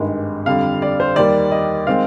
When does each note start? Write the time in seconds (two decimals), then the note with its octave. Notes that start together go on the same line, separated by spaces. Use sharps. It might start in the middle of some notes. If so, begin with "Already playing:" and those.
Already playing: G#1 G2 D#3 G#3
0.46 F2 D3 G3 F5
0.82 D5
1.00 C5
1.16 D#2 D#3 G3 A#3 D5
1.51 D#5
1.87 D#3 G#3 C4 F5